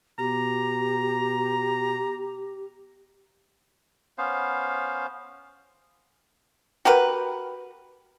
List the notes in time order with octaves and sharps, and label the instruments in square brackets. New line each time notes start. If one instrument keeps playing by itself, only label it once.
[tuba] B2 [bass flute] G4 [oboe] A#5
[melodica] B3 C#4 C5 F5
[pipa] F#4 G4 A#4 B4